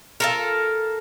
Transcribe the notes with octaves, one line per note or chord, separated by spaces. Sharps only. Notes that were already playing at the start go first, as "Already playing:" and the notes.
F4 A4 A#4